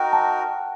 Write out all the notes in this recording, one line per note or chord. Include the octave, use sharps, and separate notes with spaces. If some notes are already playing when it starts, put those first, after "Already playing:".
Already playing: D#4 F#4 A#4 F#5 G5
A5